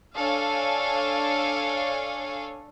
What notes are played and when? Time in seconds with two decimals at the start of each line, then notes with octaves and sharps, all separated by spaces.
0.17 D4 A4 C#5 F5 G#5